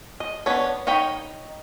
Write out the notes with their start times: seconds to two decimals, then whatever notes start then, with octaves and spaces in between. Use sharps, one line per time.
0.20 D#5
0.46 B3 C#4 D4 B4 C#5
0.87 D#4 C#5 D#5 G5 B5